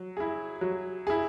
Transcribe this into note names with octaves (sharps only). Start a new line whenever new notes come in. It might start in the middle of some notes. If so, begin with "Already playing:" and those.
Already playing: F#3
E4 G#4
F#3
E4 G#4